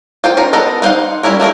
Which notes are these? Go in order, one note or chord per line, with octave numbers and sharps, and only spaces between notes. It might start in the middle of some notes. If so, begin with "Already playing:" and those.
F4 C5 G5
C#4 F4 A#4
B3 A4 A#4 D#5
B3 D#4 C5 F5 F#5
G3 C#4 E4 A#4
F#3 A3 A#3 A#4